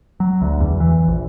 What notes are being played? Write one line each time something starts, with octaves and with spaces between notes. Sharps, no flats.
F#3
D2
E2
E3
A#1